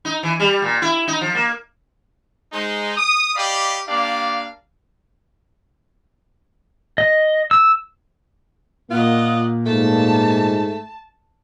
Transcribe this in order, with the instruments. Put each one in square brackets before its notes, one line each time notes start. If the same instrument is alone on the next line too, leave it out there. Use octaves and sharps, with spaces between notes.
[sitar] D#4
E3
G3
A#2
E4
D#4
F3
A#3
[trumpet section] G#3 D#4 C5
D#6
G4 D5 D#5 F5 G5 B5
A#3 D4 G4 D5 F5
[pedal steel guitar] D#5
E6
[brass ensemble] A#2 A#3 [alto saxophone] F4 [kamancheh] D#5 F#5
[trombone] G#2 [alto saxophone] A3 [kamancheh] A5